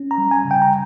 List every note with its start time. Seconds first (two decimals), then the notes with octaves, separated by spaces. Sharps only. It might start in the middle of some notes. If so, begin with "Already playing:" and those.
Already playing: C#4
0.11 A#5
0.18 G3
0.31 G#5
0.45 C#3
0.51 G5
0.62 A#5